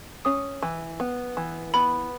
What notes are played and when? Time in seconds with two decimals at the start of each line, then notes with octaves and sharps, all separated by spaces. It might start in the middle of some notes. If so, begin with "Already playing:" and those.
0.25 C#4 D#6
0.62 E3
1.00 B3
1.37 E3
1.74 B3 B5